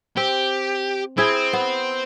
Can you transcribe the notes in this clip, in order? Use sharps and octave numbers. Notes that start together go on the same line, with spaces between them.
C4 G4
C4 E4 G#4
B3